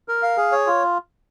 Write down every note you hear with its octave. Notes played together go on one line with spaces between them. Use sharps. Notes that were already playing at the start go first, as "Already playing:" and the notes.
A#4
F5
G#4
C#5
F4